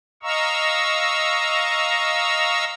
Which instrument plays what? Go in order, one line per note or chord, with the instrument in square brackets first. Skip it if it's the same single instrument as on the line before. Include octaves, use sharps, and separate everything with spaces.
[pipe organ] D#5 F5 A#5 C#6 E6